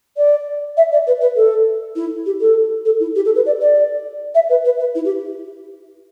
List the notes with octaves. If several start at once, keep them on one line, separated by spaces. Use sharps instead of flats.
D5
E5
D5
B4
B4
A4
E4
G4
A4
A4
E4
G4
A4
B4
D5
D5
E5
B4
B4
B4
E4
G4